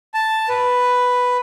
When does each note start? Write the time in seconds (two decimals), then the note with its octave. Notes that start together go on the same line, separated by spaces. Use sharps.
0.14 A5
0.49 B4